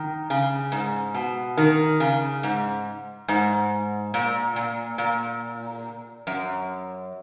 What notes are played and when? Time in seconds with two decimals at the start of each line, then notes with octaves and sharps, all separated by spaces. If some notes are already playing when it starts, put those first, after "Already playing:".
Already playing: D#3
0.30 C#3
0.72 G#2
1.14 B2
1.57 D#3
2.00 C#3
2.43 G#2
3.28 G#2
4.14 A#2
4.56 A#2
4.98 A#2
6.27 F#2